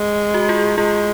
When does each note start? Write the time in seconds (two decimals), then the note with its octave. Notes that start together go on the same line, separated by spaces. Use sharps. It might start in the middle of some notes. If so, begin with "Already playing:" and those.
Already playing: G#3
0.34 F#4
0.49 F4 G#4
0.78 G#3 F4 G#4